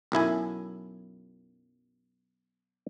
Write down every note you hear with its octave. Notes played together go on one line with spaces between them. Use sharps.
B1 F#2 E4 G#5